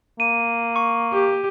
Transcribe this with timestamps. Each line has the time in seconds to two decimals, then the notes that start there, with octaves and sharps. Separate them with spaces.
0.20 A#3 D#7
0.76 C#6
1.13 G4